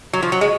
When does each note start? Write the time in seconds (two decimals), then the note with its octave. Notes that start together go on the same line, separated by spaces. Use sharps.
0.13 F#3
0.23 F3
0.32 F#3
0.41 G#3